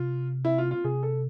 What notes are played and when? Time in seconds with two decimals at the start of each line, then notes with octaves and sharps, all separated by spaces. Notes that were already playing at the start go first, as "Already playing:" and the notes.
Already playing: C3 F4
0.45 E4
0.58 F4
0.71 F4
0.84 C3 G#4
1.03 A4